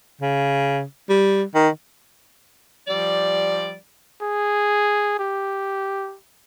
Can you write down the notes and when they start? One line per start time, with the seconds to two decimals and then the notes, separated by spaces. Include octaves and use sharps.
0.21 C#3
1.09 G3
1.55 D#3
2.88 F3 G3 D5
4.22 G#4
5.19 G4